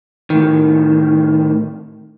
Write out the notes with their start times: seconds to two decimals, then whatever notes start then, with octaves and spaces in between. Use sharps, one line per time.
0.30 A2 D#3